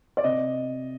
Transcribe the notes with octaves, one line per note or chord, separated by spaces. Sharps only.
D5
C3 D#5